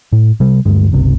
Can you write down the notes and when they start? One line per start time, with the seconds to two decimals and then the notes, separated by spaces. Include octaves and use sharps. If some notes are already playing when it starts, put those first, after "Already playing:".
0.12 A2
0.40 C3 G3
0.65 D2 G2 G#3
0.92 G1 C#2 C3